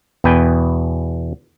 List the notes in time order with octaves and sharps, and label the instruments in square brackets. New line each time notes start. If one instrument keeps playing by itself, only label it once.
[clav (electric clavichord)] E2 B2 B4 G5 G#5